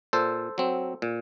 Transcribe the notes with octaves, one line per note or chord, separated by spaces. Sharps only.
A#2 A4 C5
F#3 C4
A#2